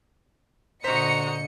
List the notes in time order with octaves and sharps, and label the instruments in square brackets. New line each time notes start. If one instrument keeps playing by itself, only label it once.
[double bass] A#2 D3 [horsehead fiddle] F#4 A#5 [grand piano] C5 B6 [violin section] D#5 C#7